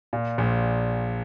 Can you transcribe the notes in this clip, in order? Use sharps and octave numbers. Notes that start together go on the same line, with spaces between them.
A#2
A#1